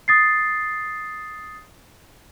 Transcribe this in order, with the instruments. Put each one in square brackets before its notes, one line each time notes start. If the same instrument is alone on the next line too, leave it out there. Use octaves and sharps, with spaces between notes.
[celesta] D#6 A6 C7